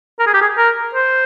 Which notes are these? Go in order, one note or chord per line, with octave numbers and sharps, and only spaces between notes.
A#4
G#4
G4
G#4
A#4
C5